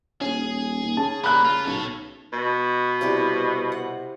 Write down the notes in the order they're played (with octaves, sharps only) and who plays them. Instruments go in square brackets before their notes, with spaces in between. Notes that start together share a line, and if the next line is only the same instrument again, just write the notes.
[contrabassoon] D#1 [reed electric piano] C#4 [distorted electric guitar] G#4
[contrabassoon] D#2
[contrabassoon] C#3 [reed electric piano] A5
[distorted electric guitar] A#3 [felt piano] B5 F#6
[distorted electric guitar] F4
[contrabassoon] B1 [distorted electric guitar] A4 C#5
[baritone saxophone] B2
[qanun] C3 G3 E4
F#5